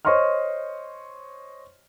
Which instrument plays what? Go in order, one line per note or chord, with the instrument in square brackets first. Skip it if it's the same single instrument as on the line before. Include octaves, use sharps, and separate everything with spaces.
[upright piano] C5 C#5 D#5 C6 C#6 F6